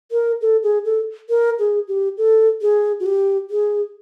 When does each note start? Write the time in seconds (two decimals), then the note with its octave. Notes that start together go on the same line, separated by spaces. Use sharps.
0.12 A#4
0.41 A4
0.63 G#4
0.85 A4
1.29 A#4
1.59 G#4
1.88 G4
2.18 A4
2.62 G#4
3.00 F#4
3.06 G4
3.50 G#4